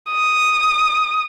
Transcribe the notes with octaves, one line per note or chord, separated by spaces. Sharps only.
D#6